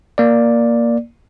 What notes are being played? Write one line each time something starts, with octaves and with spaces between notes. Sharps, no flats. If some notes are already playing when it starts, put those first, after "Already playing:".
A#3 D5